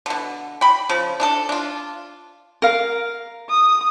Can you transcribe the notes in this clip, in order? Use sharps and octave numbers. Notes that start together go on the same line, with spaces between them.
B2 D3
G5 B5
C#3 F3
D4 G#4 A4
D4 F4
A#4 F5
D#6